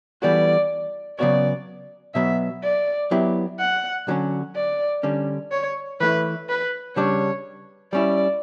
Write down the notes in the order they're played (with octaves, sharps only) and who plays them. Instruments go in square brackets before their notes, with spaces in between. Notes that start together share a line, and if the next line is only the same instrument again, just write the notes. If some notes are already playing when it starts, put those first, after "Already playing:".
[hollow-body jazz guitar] E3 G3 B3 F#4 A4 [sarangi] D5
[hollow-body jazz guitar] C#3 F#3 B3 F#4 C#5 [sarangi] D5
[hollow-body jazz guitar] B2 F#3 B3 [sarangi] E5
[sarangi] D5
[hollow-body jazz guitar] F#3 B3 E4 G4
[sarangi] F#5
[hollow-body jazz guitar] D3 F#3 C#4
[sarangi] D5
[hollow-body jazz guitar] D3 G3 C#4
[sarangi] C#5
[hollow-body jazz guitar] E3 A3 E4 [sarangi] B4
[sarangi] B4
[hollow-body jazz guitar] C#3 G3 D4 [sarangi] C#5
[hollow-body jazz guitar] G3 C#4 E4 [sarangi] D5